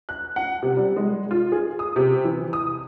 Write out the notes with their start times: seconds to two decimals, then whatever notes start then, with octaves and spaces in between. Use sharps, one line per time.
0.09 F#6
0.36 F#5
0.63 C3
0.77 G3
0.96 G#3
1.31 F4
1.52 G#4
1.79 D#6
1.96 C3
2.24 E3
2.53 D#6